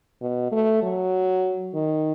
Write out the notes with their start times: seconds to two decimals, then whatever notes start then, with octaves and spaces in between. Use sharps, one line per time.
0.22 B2
0.52 A3
0.82 F#3
1.74 D#3